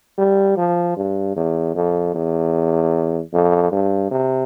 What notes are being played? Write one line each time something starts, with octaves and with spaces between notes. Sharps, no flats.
G3
F3
G2
E2
F2
E2
F2
G2
C3